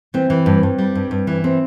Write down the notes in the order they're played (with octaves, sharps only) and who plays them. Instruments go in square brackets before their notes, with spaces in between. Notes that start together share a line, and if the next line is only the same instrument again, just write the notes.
[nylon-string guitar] E3 C4
E3
G2
G2
G3
G2
G2
E3
C4